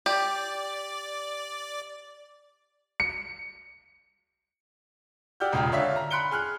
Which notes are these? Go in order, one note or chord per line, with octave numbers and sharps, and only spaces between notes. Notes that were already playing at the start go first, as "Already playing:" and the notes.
G4 D5
C#7
G4 D5 F#5 E6 F6 G6
E1 C#2 C#3 F4 G5 A#5
D3 C#5 E5 F5 B6
A#5
B5 C6 F#6 C#7 D7 G7
G#4 F6 F#6